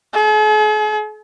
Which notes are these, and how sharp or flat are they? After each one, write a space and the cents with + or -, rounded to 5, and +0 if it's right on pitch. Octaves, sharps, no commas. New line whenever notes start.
G#4 +45